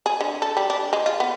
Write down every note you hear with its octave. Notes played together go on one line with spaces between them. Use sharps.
G#4
D3
A4
G3
D4
G#3
F4
B3